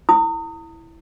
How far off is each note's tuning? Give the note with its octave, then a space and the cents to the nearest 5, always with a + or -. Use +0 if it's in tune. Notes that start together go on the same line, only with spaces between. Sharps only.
E4 +0 D#6 +10